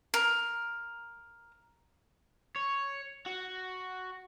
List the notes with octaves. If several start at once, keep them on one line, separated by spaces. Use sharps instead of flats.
A#4
C#5
F#4